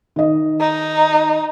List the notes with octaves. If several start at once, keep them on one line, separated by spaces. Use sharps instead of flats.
D#3 D#5
D#4